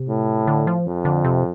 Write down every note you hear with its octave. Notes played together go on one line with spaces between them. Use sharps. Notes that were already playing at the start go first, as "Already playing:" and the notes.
Already playing: C3
A2
D3
F3
F2
D3
C3